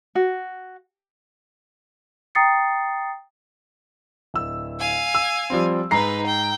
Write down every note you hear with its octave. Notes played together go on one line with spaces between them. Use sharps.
F#4
G5 A#5 D#6 A6 C7 C#7
D1 E6
F5 G#5
E6
F3 G3 C4
G#2 D#4 B4 A#5 C7
G5